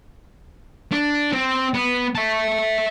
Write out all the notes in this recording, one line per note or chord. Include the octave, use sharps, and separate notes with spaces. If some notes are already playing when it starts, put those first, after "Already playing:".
D4
C4
B3
E5 A5